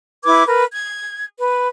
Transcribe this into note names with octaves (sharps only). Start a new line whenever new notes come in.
E4 B4 D6 G#6
A#4 B4
G#6
B4